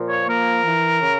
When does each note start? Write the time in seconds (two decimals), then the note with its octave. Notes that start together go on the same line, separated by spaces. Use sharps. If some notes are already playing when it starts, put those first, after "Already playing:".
Already playing: A#2 F3
0.09 C#5
0.27 A#3 A#4
0.64 E3
1.01 C#3